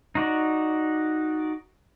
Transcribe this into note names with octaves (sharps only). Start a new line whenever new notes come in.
D#4 F#4 D5